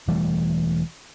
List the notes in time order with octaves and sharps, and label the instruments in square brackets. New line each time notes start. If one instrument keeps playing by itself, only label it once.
[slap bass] E1 E3 G3 A3